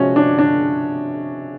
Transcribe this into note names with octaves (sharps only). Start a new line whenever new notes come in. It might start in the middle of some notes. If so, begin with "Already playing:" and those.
Already playing: C3 F3 G#3 C#4 F#4
D4
D4